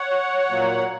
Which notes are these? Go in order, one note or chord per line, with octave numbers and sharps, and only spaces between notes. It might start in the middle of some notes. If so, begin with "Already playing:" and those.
Already playing: C#5 F#5
A#2 F#3 A#3